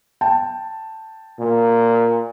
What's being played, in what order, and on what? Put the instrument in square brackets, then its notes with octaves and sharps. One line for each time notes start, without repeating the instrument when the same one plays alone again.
[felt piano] G5 A5
[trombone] A#2